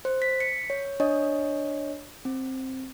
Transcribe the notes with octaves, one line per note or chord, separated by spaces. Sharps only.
C5
B6
B6 C#7
C#5
D4 C#5 D#5
C4